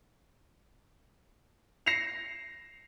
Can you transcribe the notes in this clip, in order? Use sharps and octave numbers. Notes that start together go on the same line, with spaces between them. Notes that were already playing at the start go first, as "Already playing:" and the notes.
A#6 C7 C#7 E7 F7